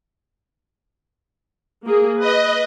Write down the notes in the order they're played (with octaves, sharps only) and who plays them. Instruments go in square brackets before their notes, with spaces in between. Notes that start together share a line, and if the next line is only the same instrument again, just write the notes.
[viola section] A#3 G#4
[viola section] B4 [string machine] D#5